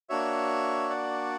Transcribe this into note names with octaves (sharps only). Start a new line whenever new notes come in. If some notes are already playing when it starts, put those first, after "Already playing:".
A#3 D4 F#4 C#5 E5
D5 F#5